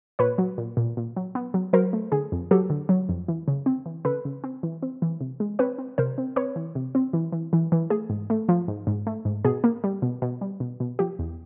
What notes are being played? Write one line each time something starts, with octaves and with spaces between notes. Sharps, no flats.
A#2 B4 C#5
F#3
A#2
A#2
A#2
F#3
B3
F#3
F#3 A#4 C5
A3
D3 G#4
F2
F#3 G4 A4
D3
F#3
F2
E3
C#3
C4
E3
C#3 A4 B4
C#3
C4
E3
C4
E3
C3
G#3
C4 B4 C#5
C4
C3 A#4 C5
C4
C4 B4 C#5
E3
C3
C4
E3
E3
E3
E3
A3 G#4
G#2
A3
F3
G#2
G#2
A3
G#2
B2 G#4
A#3
G3
B2
B2
G3
B2
B2
F3 G4
E2